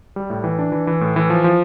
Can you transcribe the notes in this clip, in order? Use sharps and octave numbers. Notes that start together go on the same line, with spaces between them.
G3
A2
E3
D4
E3
E3
A2
E3
F3
F3